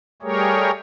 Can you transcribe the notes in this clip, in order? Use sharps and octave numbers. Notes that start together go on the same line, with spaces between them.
G3 A3 G4 G#4 A#4 C#5